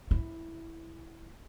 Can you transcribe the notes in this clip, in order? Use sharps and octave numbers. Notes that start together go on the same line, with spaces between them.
E4